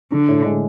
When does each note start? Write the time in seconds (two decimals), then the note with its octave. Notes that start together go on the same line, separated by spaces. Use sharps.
0.12 D3 D4
0.29 A2
0.45 G#3